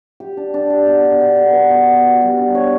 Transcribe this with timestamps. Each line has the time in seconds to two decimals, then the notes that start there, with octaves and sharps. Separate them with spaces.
0.20 G4
0.37 D4
0.54 D4
0.70 G4
0.87 B2
1.04 D4
1.21 B3
1.37 B3
1.53 B4
1.71 B3
1.88 D5
2.05 F#4
2.21 G3
2.38 D4
2.55 C#5